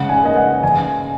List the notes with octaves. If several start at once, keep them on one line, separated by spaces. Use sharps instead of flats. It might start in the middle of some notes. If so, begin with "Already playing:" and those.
Already playing: C#3 G#3 F#5
G#5
A#3 D#5
F#5
C#3 G#5